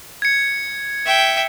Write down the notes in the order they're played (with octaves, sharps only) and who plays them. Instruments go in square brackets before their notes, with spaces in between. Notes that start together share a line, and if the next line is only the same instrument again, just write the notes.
[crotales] G#6 C#7
[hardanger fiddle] E5 G5